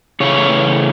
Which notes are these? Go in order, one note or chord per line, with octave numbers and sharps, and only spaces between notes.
C#3 E3 A3 C#5